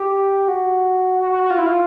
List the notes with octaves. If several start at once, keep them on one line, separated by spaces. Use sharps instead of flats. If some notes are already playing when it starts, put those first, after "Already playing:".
Already playing: G4
F#4
F#4
F#4
F#4
F4
E4
F4